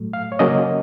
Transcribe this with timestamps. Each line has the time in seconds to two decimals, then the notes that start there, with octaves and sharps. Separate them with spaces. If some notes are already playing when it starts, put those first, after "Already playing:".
Already playing: A2 F#3 A3
0.13 F5
0.32 C#5
0.39 C#3 F#3 A#3 C#4 D#5